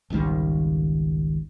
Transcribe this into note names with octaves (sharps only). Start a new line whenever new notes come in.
G#1 C#2 D#3 G3